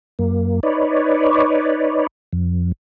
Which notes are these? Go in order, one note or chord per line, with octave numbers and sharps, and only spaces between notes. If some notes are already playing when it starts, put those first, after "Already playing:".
F#2 A#3
D#4 B4 C#5 D5
F2